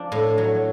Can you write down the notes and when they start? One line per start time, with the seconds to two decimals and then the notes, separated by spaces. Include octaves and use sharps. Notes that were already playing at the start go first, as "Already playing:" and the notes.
Already playing: F3 D4 F4
0.12 A2
0.38 F#3